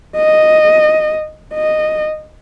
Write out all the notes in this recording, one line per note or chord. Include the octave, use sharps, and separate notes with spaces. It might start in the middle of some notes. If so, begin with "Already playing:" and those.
D#5
D#5